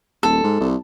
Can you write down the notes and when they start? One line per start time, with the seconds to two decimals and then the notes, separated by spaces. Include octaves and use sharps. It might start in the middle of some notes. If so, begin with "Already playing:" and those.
0.23 D#1 A4
0.44 G#2
0.60 C2